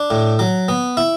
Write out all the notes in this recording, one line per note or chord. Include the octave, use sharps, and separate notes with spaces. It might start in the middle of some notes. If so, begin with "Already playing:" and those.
Already playing: D4
A2
F#3
B3
E4